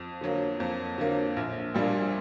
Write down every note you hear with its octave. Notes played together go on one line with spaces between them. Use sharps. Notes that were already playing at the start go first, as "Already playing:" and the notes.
Already playing: F2
D3 F#3 A#3
F2
D3 F#3 A#3
A#1
A#2 G3 A#3 D4